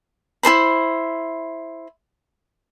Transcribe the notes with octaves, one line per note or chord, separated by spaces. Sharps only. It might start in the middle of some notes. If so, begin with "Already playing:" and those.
E4 A4 C5 B5